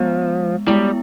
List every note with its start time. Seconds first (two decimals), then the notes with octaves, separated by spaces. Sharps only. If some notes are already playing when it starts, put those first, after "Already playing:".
Already playing: F3 G#3 B3
0.67 G3 G#3 B3 E4